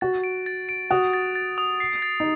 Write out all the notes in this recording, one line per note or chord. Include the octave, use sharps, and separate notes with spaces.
F#4 A6
D7
A6
D7
F#4 D#6
A6
A6
D#6
C7
A6
D#4